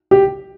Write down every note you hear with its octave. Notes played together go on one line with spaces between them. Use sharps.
G4